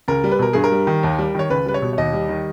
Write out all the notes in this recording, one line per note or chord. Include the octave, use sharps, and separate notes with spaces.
C#2 A#4
G3
B4
B2 A#4
G2 G#4
A#4
G3
D#3
D#2
G3
D#3 C#5
C#2 B4
G3 B4
C#5
B2
C#5
D#2 D#5
G3
D#3